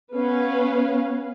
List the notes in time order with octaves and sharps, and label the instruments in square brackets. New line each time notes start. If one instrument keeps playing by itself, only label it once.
[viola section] B3 C#4 B4 F5